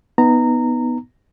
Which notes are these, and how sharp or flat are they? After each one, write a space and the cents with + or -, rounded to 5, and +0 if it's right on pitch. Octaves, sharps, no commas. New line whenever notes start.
B3 +0 D#4 +0 A#5 -15